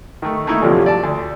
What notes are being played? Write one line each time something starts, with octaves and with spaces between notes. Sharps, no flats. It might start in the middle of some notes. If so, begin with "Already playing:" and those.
D#3 A3
A3 A#3 D#4 E4
A1 D2 G2 C3 F3 F#3
D5 A5
D2